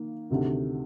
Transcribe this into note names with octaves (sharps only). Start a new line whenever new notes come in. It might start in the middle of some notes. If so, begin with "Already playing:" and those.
Already playing: D#3 A#3
D2 C3 D#3